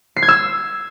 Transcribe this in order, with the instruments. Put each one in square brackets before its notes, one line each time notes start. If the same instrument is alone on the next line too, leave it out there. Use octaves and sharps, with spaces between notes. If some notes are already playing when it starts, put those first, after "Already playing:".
[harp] C7
G#6
E6